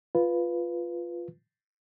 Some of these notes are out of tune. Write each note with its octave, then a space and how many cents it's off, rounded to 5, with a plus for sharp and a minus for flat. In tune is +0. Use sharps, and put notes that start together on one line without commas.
F4 +0 B4 +0